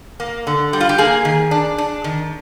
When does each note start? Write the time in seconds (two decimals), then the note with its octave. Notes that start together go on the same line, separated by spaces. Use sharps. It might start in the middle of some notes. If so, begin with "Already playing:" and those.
0.20 A#3
0.47 D3
0.73 G3
0.81 F4
0.89 G4
0.98 A#3 G#4
1.25 D#3
1.51 D4
1.78 D4
2.04 D#3